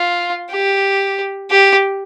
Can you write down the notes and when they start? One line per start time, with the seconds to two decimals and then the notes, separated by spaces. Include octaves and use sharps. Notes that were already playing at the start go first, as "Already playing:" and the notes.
Already playing: F4
0.51 G4
1.51 G4